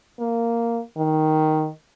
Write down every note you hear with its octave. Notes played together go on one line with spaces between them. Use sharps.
A#3
D#3